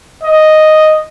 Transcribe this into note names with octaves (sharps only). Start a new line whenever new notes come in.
D#5